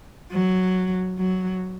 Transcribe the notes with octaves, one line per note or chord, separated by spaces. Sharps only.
F#3
F#3